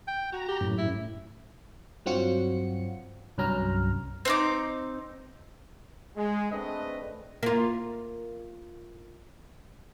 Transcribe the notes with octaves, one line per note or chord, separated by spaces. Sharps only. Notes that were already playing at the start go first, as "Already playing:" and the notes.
G5
F#4 A#5
G4
F#2 A2
E4
G2 F#3 C4 F4 F#4 C#7
C2 G2 F#3 C#4 A#5 F6
C4 D#4 D6
G#3
A3 C4 D4 G#4 B4 D#5
A#3 F4